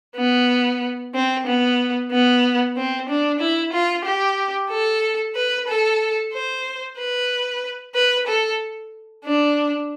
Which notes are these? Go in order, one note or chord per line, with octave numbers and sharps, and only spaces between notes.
B3
C4
B3
B3
C4
D4
E4
F4
G4
A4
B4
A4
C5
B4
B4
A4
D4